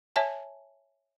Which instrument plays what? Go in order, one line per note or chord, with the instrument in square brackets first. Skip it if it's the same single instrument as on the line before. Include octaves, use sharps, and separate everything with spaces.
[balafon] C#5 E5 G#5 A5